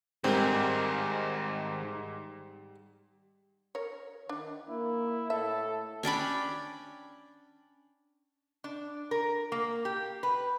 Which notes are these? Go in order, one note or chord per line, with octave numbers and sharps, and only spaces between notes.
G#2 D#3 G3 C4 G#4 A#4
A#4 C#5
D#3 D4
A#3 E4
A2 A4 E5
C#4 D4 G5 B5
D4
A#4
A#3
G4
B4